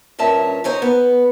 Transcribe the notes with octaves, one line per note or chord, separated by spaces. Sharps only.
G2 A#2 C#4 A#4 E5 A5
D#4 C5 C#5 G#5
B3